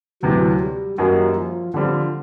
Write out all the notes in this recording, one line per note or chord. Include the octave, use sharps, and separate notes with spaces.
D2 C3 E3 F#3
G3
F#2 D#3 F#3 G3 A#3
F3
D3 F3 G3 C4